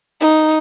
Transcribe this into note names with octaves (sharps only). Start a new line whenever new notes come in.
D#4